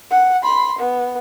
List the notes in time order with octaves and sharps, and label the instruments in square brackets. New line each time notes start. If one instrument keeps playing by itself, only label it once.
[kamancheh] F#5
B5 C6
B3